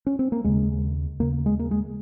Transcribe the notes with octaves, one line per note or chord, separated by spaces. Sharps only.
C#4
C4
A#3
D#2 C#3 G#3
D#2 C#3 A#3
G#3
A#3
G#3